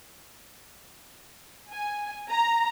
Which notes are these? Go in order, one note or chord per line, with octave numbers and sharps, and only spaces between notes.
G#5
A#5